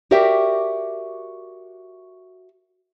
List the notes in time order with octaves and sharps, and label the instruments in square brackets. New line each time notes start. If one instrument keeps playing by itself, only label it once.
[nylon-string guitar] F#4 G4 A#4 D5 E5 G5